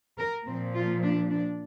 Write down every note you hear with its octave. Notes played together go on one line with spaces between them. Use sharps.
A#4
A#2 F3 C4
F4
D4
D4